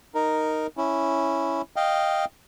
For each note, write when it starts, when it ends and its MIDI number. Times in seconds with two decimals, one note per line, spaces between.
0.15 0.67 63
0.15 0.67 70
0.77 1.62 61
0.77 1.62 64
1.76 2.25 75
1.76 2.25 77
1.76 2.25 79